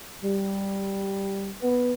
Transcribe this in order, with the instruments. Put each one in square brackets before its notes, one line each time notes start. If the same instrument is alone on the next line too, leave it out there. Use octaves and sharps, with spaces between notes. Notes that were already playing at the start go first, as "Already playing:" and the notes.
[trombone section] G3
B3